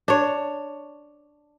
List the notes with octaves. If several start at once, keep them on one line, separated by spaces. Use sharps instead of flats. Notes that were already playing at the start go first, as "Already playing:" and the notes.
D4 C#5